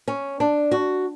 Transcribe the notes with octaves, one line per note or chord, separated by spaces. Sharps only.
C#4
D4
F#4